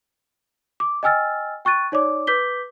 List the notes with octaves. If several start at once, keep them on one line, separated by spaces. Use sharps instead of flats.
D6
D#5 G5 G#5 E6 F6 A6
G5 C#6 F#6 A6 D#7
D#4 C#5 D5 D6
B4 D6 G6 B6 G7